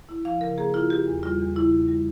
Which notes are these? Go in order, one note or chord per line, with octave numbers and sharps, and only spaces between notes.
E4
F3 F5
C#3 A#4
A#3 G#4
E4 F4
C#3 G4
E2
G3 F4
E2
C#3 E4
E2
G3